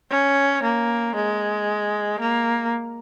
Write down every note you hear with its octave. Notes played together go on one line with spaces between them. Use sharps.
C#4
A#3
G#3
A#3